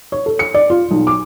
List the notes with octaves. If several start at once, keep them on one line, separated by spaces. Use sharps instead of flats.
C#5
A4
C#7
D5
F4
B1
D6